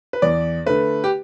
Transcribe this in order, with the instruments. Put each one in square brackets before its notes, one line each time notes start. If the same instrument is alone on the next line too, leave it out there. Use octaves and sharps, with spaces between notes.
[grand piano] B4
E2 D5
D3 A3 B4
G4